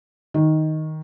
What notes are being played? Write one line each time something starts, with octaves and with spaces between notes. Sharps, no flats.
D#3